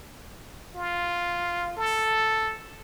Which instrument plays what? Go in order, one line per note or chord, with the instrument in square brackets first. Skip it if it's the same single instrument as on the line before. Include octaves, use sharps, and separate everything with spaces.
[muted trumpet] F4
A4